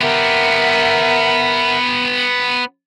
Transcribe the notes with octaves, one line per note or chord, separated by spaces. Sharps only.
B3 G4 A#4 E5 F#5